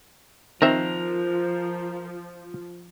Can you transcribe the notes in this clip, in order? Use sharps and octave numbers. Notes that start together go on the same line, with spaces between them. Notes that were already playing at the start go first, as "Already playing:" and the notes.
D#3 F3 C4 A#4 C5 E5